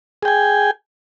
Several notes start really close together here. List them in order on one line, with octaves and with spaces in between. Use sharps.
G#4 G5 G#5